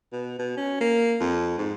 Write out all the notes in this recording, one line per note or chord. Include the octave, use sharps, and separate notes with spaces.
B2
B2
C#4
A#3
F2
G#2